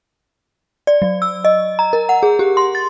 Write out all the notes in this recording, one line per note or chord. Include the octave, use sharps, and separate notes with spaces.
D5
F#3
E6
D#5
A#5
A#4
F#5
G#4
G4
C6
A6